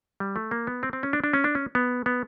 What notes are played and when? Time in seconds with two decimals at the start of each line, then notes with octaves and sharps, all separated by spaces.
0.20 G3
0.36 A3
0.51 A#3
0.67 B3
0.83 C4
0.93 C4
1.03 C#4
1.13 D4
1.24 D4
1.33 C#4
1.44 D4
1.55 C#4
1.75 B3
2.06 B3